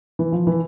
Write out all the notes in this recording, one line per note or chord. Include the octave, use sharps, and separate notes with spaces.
E3
F3
E3